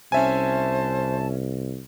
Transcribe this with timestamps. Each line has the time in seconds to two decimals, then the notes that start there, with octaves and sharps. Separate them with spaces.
0.12 C2 C#4 C5 E5 G#5 A5